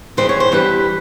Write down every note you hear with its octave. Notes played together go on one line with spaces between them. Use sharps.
G#2 E3 G3 C5
C#5
C5
G2 E3 G3 B4